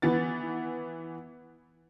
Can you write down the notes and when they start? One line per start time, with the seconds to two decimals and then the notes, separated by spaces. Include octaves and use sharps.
0.02 E3 B3 A6